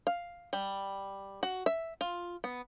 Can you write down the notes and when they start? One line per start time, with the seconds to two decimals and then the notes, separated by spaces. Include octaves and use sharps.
0.07 F5
0.53 G3
1.43 F#4
1.66 E5
2.01 F4
2.44 B3